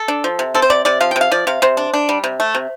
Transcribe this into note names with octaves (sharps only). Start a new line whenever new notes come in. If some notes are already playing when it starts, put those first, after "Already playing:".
Already playing: A4
D4
F3
C3
C4 A4
C5
C3 D5
C3 D5
F3 F5
G5
C3
F5
F3 D5
C3 F5
C3 C5
D4
D4
G3
C3
A3
C3